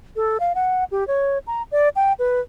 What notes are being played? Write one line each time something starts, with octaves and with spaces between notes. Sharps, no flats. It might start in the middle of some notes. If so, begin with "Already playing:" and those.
A4
F5
F#5
G4
C#5
A#5
D5
G5
B4